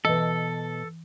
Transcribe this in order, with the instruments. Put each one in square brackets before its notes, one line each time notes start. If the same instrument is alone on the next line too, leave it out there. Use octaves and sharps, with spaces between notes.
[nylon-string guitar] B2 D#5 [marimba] E3 [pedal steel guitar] A4